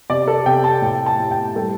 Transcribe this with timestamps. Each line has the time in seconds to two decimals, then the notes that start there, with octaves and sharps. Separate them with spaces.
0.10 C3 D5
0.27 A4
0.46 C3 G5
0.64 A5
0.82 A2 G5
1.06 A5
1.19 A2
1.31 G5
1.56 G3 A4